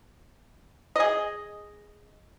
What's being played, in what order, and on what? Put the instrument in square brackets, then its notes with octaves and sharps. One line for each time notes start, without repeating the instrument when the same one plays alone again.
[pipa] G#4 D#5